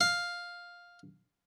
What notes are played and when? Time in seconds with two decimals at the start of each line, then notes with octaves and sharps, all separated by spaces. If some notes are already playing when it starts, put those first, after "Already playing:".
0.01 F5